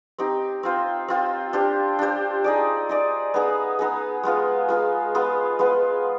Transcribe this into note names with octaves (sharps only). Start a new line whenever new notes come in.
C4 D#4 G4
C4 F4 C5
C4 F4 C5
D4 G4 C5
D4 G4 C5
D#4 G#4 D5
D#4 G#4 D5
B3 D#4 G#4
B3 D#4 G#4
G#3 B3 F4 G#4
G#3 B3 F4 G#4
G#3 B3 F4 B4
G#3 B3 F4 B4